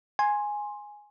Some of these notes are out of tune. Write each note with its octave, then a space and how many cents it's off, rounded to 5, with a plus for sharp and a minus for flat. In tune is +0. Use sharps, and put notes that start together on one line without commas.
G#5 +0 C6 +15